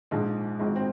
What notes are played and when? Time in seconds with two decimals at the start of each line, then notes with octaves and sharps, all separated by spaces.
0.11 A#1 G#2 F3 G#3
0.59 G#1 G#2 F3 G#3
0.76 C4